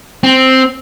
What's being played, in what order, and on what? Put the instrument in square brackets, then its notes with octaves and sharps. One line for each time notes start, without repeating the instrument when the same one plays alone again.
[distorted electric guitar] C4